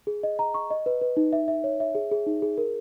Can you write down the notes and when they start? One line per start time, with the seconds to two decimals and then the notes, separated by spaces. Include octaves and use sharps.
0.07 G#4
0.23 D#5
0.39 A#5
0.54 C#6
0.71 D#5
0.86 B4
1.01 B4
1.17 D#4
1.33 E5
1.48 E5
1.64 C#5
1.80 E5
1.95 G#4
2.11 G#4
2.26 D#4
2.42 G#4
2.58 A#4